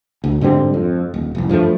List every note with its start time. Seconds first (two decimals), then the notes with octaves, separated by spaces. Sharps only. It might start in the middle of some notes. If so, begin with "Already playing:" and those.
0.24 D2
0.41 G#2 D3 G3 C4
0.74 F2
1.14 D#1
1.35 F1 C2
1.49 G2 F3 F#3 A3